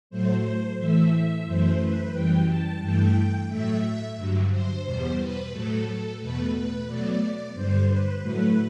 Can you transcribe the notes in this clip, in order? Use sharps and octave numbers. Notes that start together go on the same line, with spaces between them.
A2 F#3 A3 C5
A2 E3 A3 E5
F#2 E3 A3 C5
B4
F#2 E3 G3 G5
A5
G2 E3 A3 G5
A2 F#3 A3 E5
G2 D3 F#3
C5
E2 B2 G3
B4
A2 F#3 A3 A4
E2 B2 A3 B4
B4
B2 F#3 A3 D5
G2 D3 G3 C5
B4
A2 F#3 A3 B4